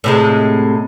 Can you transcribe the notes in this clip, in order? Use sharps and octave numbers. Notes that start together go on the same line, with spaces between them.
A2 C3 G#3